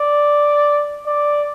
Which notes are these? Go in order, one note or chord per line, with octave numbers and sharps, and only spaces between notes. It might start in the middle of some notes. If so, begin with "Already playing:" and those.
Already playing: D5
D5